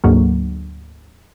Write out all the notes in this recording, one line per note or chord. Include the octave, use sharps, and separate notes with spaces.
D2 G#2 F#3 A#3